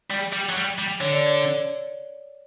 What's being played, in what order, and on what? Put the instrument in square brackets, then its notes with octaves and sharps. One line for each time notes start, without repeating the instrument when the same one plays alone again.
[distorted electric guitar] G3
G3
F#3
G3
G3
[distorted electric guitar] D3 [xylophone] C#5
[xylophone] D5
C#5